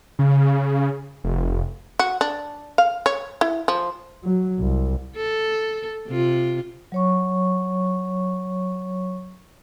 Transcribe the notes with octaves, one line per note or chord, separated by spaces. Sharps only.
C#3
F1
F#4
D4
F5
C#5
E4
F3
F#3
C2
A4
C3 F4
F#3 C#5 C#6